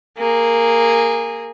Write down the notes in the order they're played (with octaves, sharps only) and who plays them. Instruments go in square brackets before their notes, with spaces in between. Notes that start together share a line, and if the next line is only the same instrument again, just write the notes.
[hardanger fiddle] A#3 G#4